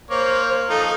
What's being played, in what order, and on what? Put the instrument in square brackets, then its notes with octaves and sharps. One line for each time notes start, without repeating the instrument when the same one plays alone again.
[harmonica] A#3 C#5 [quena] C5
[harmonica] F3 D#4 F4 [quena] A4